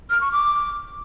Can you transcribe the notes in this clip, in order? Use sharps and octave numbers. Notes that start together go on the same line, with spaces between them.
F6
C#6
D6